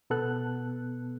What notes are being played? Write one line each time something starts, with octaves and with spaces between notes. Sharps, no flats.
B2 B3 A4 F#6